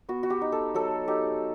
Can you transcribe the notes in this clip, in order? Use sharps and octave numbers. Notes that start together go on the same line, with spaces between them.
B3 F#4
F#4
G4
D#4
A4
F#3 A4
D#4 G4